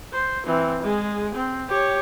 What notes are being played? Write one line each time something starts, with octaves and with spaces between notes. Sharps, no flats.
C5
E3 C4
G#3 G#4
C4
G4 C#5